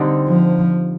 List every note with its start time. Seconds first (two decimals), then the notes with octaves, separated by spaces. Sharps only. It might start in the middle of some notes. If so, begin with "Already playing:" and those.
Already playing: D3 G3 C4 D#4
0.28 F3